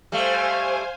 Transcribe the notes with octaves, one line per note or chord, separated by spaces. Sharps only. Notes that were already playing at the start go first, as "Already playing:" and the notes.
G3 A3 C5 F5 G#5